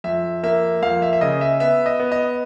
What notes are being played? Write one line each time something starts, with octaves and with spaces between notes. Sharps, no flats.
F2 E5
A#3 E5
F2 F5
E5
E5
C#3 D#5
E5
B3 E5
D#5
B3
D#5